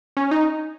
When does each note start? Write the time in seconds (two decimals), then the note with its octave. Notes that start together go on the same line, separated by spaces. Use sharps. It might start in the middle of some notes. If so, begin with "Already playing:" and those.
0.17 C#4
0.31 D#4